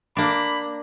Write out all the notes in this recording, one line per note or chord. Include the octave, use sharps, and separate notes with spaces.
A#3 D4 B5